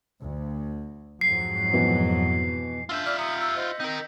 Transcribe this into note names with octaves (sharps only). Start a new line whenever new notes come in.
D2
F2 G#2 F#3 C7
B2 E3
D4 F4 E5 E6 G6
D5 F6 B6
A#5 D#6 C#7
E6
C5 D#5
C4 D#4 A#4